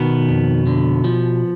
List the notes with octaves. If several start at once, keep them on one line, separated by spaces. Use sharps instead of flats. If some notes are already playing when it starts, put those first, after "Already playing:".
Already playing: B2 D#3 B3
F2
D3
F3